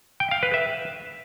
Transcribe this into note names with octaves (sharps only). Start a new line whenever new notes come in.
G5
F5
B4
E5